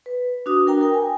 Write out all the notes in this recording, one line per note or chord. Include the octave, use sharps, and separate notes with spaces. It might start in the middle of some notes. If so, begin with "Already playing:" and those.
B4
D4 F#4 D#6
A#4 G5 A#5
A#4 G5
G#5